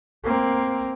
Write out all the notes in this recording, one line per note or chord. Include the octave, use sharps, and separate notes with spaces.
A#3 C4